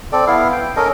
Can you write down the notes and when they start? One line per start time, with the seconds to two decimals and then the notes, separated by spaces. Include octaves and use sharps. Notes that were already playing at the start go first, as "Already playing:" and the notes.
0.12 C4 A4 D5
0.27 B3 E4 F5
0.52 G5
0.76 C#4 A4 A#4 D#5